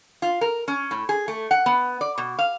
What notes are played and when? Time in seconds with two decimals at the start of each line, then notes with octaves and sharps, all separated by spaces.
0.22 F4
0.41 A#4
0.68 C#4
0.91 A2
1.09 G#4
1.28 A3
1.51 F#5
1.66 B3
2.01 D5
2.18 B2
2.39 F5